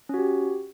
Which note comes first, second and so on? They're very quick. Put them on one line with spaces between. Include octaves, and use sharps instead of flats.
C#4 F#4 G4